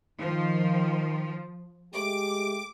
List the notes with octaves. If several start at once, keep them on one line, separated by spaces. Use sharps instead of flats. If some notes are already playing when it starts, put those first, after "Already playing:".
D#3 F3
G#3 A3 G4 D6